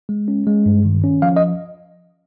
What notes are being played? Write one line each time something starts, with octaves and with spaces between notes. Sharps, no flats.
G#3
C#4
G#3
G2
D#3
C#4
F3 F5
D#5